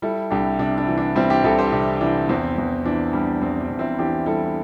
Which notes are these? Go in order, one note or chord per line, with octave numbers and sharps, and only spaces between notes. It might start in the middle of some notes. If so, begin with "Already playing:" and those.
G3 E4 A4
C2 D4 G4
C3 D4
D4
E3
D4
G3 C4 E4
D4 G4
C2 E4 A4
G4 C5
C3 D4
E3 D4
E2 C4
E2
E3 D4
G3 D4
E2 C4
D4
E2
C4 E4
E3 D4 G4
G3 E4 A4